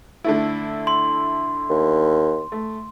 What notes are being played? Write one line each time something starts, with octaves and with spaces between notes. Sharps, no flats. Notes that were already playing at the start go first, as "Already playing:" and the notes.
D3 A3 E4
C6
D#2
A3